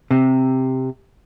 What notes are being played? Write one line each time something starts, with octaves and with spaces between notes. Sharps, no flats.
C3